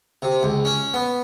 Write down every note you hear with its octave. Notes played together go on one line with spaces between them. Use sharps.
C3
C#2
C#4
B3